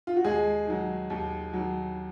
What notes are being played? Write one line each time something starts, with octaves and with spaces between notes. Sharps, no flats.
F4
F#4
D#2 G#3 G#4
D#3 F#3
D#2
D#3 F#3